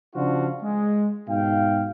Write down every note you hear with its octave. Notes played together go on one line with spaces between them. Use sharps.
C#3 F3 D4 F4 F#4
G#3
G#2 B2 F5 G5